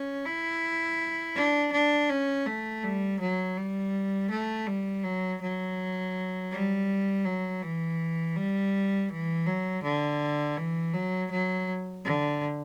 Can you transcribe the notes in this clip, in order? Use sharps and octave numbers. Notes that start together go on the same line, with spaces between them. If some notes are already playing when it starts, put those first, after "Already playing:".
Already playing: C#4
E4
D4
D4
C#4
A3
G3
F#3
G3
A3
G3
F#3
F#3
G3
F#3
E3
G3
E3
F#3
D3
E3
F#3
F#3
D3